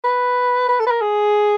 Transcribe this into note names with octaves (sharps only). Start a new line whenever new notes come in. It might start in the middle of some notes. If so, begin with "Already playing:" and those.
B4
B4
A4
B4
A#4
G#4